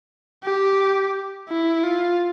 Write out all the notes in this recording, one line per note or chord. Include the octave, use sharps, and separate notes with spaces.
G4
E4
F4